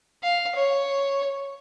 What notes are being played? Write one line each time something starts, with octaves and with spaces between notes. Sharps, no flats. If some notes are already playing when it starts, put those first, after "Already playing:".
F5
C#5